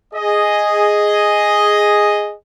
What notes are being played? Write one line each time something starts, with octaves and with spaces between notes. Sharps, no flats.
G#4 D#5